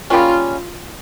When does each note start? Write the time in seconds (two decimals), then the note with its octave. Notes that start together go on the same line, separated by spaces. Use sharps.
0.10 C#3 G3 A#3 C#4 F4